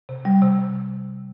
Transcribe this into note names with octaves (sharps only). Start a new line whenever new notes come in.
C3
G3
C3
C3